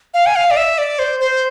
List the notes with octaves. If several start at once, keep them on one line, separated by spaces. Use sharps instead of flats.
F5
G#5
F5
D5
E5
D5
C5
C5